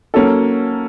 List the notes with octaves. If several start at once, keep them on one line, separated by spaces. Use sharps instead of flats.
F#3 A#3 C#4 F#4 A4